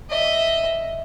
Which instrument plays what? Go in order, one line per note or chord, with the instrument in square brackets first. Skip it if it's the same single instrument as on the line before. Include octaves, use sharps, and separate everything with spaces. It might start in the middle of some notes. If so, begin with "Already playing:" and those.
[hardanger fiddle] D#5 E5